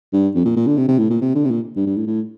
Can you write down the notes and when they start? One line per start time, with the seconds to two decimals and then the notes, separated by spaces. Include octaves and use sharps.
0.13 G2
0.35 F2
0.45 A#2
0.56 A#2
0.67 D3
0.77 C3
0.88 C3
0.99 A2
1.10 A#2
1.21 C3
1.35 D3
1.45 C3
1.50 A#2
1.76 G2
1.86 G2
1.97 A2
2.07 A2